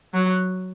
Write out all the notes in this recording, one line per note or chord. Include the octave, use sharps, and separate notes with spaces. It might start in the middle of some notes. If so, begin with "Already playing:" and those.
F#3